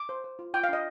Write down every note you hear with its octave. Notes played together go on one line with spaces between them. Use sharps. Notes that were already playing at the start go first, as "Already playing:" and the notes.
Already playing: D6
C5
C5
F4
F4 G5
F5
D4 D#5